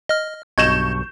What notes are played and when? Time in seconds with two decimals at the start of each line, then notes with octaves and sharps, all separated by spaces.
0.09 D#5 F6
0.58 B1 G2 B2 D#5 C#6 G6 G#6 E7